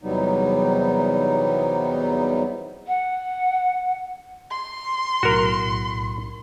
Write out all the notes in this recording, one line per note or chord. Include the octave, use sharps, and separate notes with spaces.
E2 C3 F#3 G3 B3 D#4
F#5
C6
B1 A2 F#4 A#4